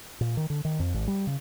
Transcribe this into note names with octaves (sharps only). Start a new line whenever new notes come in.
A#2
D#3
D3
D#3
F2
G#1
G3
C#3